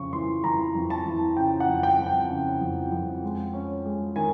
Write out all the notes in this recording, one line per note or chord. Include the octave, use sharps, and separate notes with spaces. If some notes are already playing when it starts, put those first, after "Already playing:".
Already playing: F2 C#3 C#6
E3 C6
E3 A#5
F2
A5
E3
C#3 G5
F#5
F2
G5
F2
G5
C#3
F2
F2
G#3
C#4
G#3
D#3 G#5